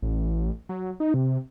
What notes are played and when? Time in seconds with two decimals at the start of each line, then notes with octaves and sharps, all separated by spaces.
0.02 A1
0.69 F#3
1.00 D#4
1.14 C3